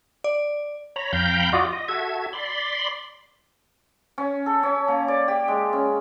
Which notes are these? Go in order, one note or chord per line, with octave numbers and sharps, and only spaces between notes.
D5
C#5 A#5 B5
F2 F5 G5 A#5 B5 G6
F4 F#4 D5 D#5
D#5
F#4 A4 E5 G#6
D5 B5 C6
C#4
A4
C#4
A#3
D5
G4
G#3
C#4